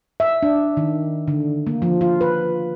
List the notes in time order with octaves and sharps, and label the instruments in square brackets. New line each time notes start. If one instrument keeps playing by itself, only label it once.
[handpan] E5
D4
D#3
D3
A#3
F3
F4
B4